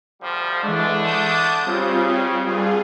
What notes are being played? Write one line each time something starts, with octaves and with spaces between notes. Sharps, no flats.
D2 F3 G3
D3 E3 G#3 A3 D4
A5 D#6 G6
C#3 G3 C4 F4
A#1 G2 G3 F4 G#4